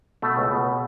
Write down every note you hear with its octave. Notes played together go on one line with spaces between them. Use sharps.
B2 A3
C#2
B2